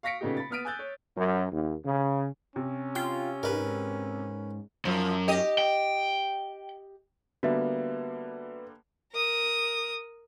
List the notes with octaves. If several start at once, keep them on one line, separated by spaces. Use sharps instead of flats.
F5 C#6 A#6 B6 C#7 D7
A#2 C#3 A3 B3 D#4 G4
B5 A6
B3 D#6 F6 B6 D7 D#7
G#5 E6 F#6 G6 A6
C#5
F#2
D#2
C#3
C3 C#4
F4 G5
G#2 A#4 B4
F#2 F3
G4 D#5
G5
D3 G3 A#3 B3 F#4 E5
A#4 D#6